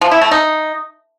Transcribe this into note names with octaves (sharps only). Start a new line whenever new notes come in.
F3
E4
A3
D#4